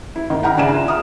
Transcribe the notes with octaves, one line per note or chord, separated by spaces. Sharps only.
E4
D#3
F#5 G5 A#5 B5 F6
C#3 D4 D5 E5 G#5 E7
F4
E5 D#6 F6